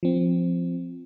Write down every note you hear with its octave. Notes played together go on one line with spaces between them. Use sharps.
F3 C4